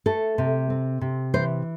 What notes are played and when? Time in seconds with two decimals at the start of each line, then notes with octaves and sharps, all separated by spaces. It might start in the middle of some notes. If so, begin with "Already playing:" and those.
0.06 A3 A4
0.38 C3
0.70 C4
1.01 C3
1.34 E3 C5